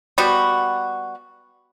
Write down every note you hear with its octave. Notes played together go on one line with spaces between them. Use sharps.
G3 B3 F#4